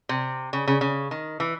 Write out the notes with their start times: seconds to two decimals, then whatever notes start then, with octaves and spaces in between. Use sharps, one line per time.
0.09 C3
0.53 C#3
0.67 C#3
0.81 C#3
1.11 D#3
1.40 E3